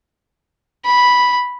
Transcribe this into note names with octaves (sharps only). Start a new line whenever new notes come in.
B5